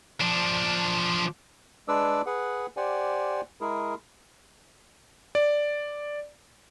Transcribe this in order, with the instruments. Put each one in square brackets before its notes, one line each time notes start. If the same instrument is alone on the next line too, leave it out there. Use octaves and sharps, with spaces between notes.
[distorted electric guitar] F3 D4
[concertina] G#3 D4 B4 D5 D6 E6
G#4 B4 F#5
G4 C5 D5 F#5 G#5
G#3 E4 G#4 A#4
[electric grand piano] D5